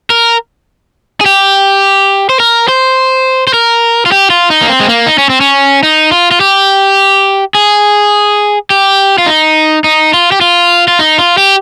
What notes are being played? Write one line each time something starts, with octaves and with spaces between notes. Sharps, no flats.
A#4
G#4
G4
C5
A#4
C5
C5
A#4
F4
G4
F4
D#4
A#3
C4
G#3
A#3
D#4
C#4
C4
C#4
D#4
F4
F4
G4
G#4
G4
F4
D#4
D#4
F4
G4
F4
F4
D#4
F4
G4